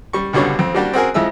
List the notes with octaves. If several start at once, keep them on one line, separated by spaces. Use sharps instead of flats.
G3 C#6
C#2 B2 D3 G3 C#5
F2 C4
G3 A#3 D4 F#4 G4
C4 F#4 G#4 A#4
F2 F3 G#3 E4 E6